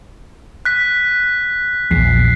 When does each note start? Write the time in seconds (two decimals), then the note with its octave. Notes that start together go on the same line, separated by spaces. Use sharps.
0.65 F#6 B6
1.91 A#1 E2 C7